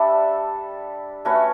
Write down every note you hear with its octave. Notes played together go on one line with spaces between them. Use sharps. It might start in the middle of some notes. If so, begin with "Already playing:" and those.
Already playing: G3 D4 A4 E5
A3 C#4 F#4 B4